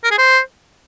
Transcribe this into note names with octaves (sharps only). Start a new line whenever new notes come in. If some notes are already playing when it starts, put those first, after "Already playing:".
A#4
G#4
C5